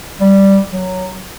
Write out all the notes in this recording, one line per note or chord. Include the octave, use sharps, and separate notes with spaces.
G3
F#3